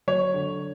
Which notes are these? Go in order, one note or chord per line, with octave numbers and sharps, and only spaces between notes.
F#3 C#5
D3